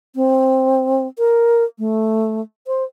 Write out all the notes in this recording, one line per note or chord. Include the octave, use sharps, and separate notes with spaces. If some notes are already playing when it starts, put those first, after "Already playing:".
C4
A#4
A3
C5